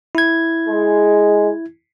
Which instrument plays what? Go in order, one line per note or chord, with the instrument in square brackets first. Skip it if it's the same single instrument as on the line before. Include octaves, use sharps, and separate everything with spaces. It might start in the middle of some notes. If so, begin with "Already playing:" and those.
[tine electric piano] E4 G#6
[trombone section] G#3